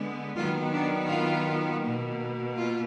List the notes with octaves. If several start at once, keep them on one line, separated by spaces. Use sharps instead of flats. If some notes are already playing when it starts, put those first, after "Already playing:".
Already playing: D3 G#3 B3
D#3 F#3 B3 F4
D4
F4
B2 A#3
F4